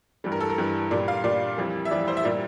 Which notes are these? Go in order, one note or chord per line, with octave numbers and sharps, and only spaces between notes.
G2 E3 G3
A#4
A4
A#4
G2 E3 G3
A#2 G3 D5
F5
A#2 G3 D5
F2 E3 G3
E5
F2 E3 G3 D5
C5
E5
A#2 G3 D5